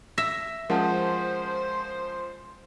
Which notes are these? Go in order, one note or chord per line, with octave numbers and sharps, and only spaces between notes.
E5 A#6
F3 G#3 C#4 A#4 C5 F#5 A5